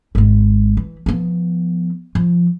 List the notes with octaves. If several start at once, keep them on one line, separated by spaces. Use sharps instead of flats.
G#1 G#3
E3
F3 B3
F3